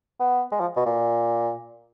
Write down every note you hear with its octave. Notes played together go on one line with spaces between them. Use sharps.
B3
G#3
F3
B2
A#2